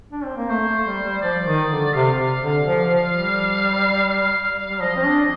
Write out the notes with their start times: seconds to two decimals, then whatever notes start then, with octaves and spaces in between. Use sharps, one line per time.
0.12 D4
0.25 C4
0.37 A#3
0.50 A3 C5
0.68 A3
0.86 G3
1.04 G3
1.22 F3 D5
1.45 D#3
1.70 D3
1.94 C3 F5
2.17 C3
2.42 D3
2.66 F3
2.90 F3
3.14 G3
4.09 F5
4.69 G3
4.81 F3 D#5
4.96 C4
5.06 D4